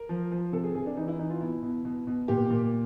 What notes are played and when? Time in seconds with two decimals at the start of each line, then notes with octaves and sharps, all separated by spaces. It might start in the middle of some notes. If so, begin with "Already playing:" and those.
Already playing: A#4
0.09 F3
0.31 F3
0.52 C3 A4
0.64 G#4
0.75 C3 G#4
0.86 D4
0.97 E3 D#4
1.08 E4
1.19 E3 D#4
1.30 F4
1.41 B2 E4
1.63 B2
1.85 B2
2.07 B2
2.28 A#2 G4
2.50 A#2